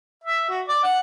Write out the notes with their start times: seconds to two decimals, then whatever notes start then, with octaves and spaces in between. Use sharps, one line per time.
0.24 E5
0.49 F#4
0.68 D5
0.84 F#5